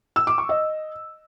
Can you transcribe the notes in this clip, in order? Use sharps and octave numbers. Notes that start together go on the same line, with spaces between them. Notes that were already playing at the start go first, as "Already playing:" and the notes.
E6
D6
C#6
D#5